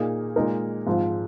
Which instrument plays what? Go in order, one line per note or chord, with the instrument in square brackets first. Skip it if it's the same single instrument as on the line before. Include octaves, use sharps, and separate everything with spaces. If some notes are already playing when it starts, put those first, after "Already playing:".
Already playing: [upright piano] A#2 A#3 D#4 G#4
A#2 G#3 D#4 A#4
G#2 F3 C4 F4